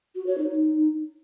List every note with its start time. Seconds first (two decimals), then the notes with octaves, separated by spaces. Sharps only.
0.15 F#4
0.27 C#5
0.38 D#4